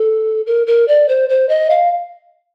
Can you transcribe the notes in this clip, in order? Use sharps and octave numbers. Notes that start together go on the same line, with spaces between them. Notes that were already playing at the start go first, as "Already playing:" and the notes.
Already playing: A4
A#4
A#4
D5
C5
C5
D#5
F5